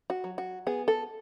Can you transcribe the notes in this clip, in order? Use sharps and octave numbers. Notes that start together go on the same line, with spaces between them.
F#4
F#3
F#4
B3 G#4
A4